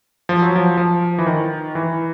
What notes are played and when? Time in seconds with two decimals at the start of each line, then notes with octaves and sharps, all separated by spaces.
0.29 F3
0.42 F#3
0.56 F3
0.77 F3
1.18 E3
1.27 D#3
1.75 E3